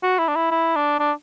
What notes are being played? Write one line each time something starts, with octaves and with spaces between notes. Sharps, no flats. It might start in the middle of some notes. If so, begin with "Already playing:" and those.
F#4
E4
D4
E4
E4
D4
D4